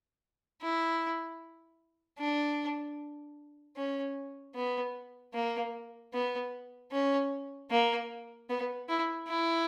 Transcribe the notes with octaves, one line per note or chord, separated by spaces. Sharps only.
E4
D4
C#4
B3
A#3
B3
C#4
A#3
B3
E4
E4